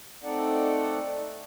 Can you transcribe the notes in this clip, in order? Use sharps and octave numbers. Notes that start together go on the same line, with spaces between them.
A3 C4 D#4 A4 D5 F#5